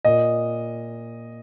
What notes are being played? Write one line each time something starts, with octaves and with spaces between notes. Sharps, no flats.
A#2 D#5